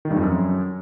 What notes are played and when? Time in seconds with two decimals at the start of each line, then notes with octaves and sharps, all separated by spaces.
0.05 D#3
0.10 G2
0.16 F2
0.22 F#2